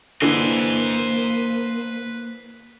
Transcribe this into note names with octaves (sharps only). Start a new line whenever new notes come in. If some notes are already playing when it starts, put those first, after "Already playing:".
D3 E3 A#3 B4 C5 D#5